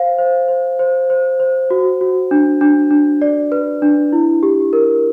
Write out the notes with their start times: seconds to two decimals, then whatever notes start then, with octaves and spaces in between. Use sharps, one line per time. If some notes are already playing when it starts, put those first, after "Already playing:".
Already playing: C5 F5
0.18 C5
0.48 C5
0.79 C5
1.10 C5
1.40 C5
1.71 F#4
2.01 F#4
2.31 D4
2.61 D4
2.91 D4
3.22 D5
3.52 B4
3.82 D4
4.13 E4
4.43 G4
4.73 A#4